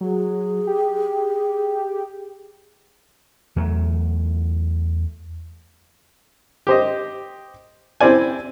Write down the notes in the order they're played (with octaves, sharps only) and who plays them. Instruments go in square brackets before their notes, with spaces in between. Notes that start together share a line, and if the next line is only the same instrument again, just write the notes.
[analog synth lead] F#3 [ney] G#4
[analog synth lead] G4
[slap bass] E2 F#3 A3
[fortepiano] G4 C5 D#5
C4 E4 C5 D5 G#5